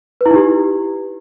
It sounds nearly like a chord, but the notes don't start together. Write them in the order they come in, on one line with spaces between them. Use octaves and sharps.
B4 E4 D#4 G4